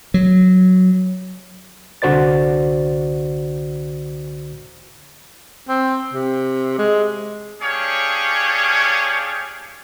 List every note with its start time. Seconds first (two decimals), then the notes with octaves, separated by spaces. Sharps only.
0.14 F#3
2.02 C2 D3 F#4 C5 D5 A6
5.69 C4
6.13 C3
6.78 G#3
7.61 C#4 D4 G4 G#4 C#5 F5